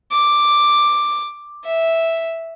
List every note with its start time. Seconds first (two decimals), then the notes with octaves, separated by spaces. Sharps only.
0.12 D6
1.64 E5